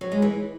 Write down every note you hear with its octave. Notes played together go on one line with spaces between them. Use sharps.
F#3
G#3
E3